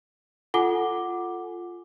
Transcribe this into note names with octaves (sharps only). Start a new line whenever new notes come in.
F4 A4 F#5 G#5 D6 G7